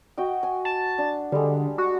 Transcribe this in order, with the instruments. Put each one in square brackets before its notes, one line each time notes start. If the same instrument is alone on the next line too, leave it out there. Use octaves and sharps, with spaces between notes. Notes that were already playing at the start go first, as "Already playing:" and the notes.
[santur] F#4 D#5 G5
G#5
[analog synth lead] A5
[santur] D4
[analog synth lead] D3 [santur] G3 G#3
[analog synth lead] F#4